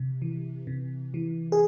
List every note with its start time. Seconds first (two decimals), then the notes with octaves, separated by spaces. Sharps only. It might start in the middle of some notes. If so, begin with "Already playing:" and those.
Already playing: C3
0.22 E3
0.67 C3
1.14 E3
1.52 G#4